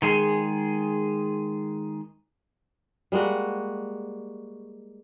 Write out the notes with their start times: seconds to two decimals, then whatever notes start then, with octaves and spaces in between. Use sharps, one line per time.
0.02 D#3 G#3 G#4
3.12 G3 G#3 A#3 F#4